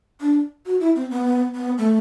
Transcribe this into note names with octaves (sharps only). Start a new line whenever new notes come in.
D4
F#4
E4
C4
B3
B3
A3